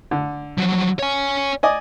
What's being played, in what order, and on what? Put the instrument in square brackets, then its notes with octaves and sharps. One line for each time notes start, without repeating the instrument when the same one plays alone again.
[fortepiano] D3
[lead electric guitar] F3 F#3
C#5 G#5
[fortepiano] D5 D#5 G#5